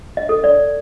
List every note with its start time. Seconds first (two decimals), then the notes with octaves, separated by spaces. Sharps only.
0.17 D#5
0.29 A4
0.44 D5